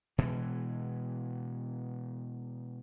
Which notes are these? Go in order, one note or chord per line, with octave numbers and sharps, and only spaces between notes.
B2 E3 G#3